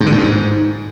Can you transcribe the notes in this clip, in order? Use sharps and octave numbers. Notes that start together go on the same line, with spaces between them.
G#2
D3
A2
G2
G#2